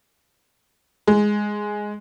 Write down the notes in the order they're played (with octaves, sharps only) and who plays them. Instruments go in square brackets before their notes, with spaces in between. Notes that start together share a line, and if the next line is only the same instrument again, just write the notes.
[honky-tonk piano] G#3